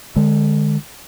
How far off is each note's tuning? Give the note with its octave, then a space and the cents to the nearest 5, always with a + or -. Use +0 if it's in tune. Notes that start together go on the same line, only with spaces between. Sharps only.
D3 +35 G#3 +0